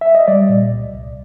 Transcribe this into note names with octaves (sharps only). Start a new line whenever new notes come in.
E5
D#5
G3 D5
A#2
C2
C2